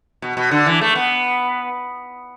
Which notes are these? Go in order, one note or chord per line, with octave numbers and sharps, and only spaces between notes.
B2
B2
D3
E3
A3
B3